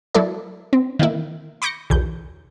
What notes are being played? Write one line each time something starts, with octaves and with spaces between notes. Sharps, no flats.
F#3 E4 A4 D5
C4
D#3 E3 A#3 E4
B5 C#6 D6 G6 A#6 C#7
B1 E2 G6